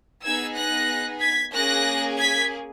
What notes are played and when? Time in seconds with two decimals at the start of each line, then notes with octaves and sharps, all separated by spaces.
0.24 B3 D#4 G#4 E6 G#6
0.55 F#6 A#6
1.21 G#6 B6
1.52 A#3 C#4 G#4 F#6 A#6
2.18 G#6 B6